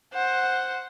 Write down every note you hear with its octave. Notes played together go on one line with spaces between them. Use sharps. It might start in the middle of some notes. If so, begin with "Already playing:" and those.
C5 F#5